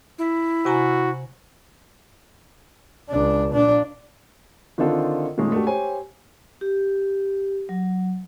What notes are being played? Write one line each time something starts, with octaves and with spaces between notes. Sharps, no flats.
E4
C3 F#4 G#5 A#5
C#2 D4
A#2 D4
D3 D#3 C4 D4 F4 A4
A#2 D#3 G#3 A3 C#4
A3 D4 F#4 G4 A4
G4 C5 C#5 G#5
G4
F#3